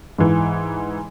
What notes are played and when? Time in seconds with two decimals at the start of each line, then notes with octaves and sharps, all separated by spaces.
0.18 G#2 E3